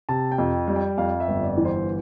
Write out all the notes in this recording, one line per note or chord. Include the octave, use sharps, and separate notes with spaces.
C3 A5
G5
F2
G3
G5
F2 F5
E5
G1
D5
E3
C5